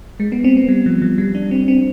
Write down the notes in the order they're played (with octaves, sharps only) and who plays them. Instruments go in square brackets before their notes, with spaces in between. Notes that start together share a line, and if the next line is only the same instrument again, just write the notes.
[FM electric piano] G#3
B3
C4
B3
G3
F3
F3
G3
D4
C4
C4